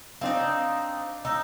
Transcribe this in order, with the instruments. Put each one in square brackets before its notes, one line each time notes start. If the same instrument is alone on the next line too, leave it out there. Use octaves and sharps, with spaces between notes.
[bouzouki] C4 D#4 [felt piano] D4 F5
[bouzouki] D#4 [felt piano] E6